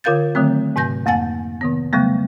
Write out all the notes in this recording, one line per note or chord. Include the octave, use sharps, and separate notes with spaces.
D3 F4 A#4 F5 G6 A6
D3 D#3 F#3 A3 C4
G#2 C3 G#5 G6 A#6
F2 A#3 F#5 G#5 A6
C3 D#3 B3
C#3 F#3 G3 A3 B3